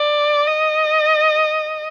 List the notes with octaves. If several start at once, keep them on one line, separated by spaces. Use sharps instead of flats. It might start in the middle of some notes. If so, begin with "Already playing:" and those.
Already playing: D5
D#5